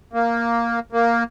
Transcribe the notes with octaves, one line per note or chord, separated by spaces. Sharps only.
A#3
A#3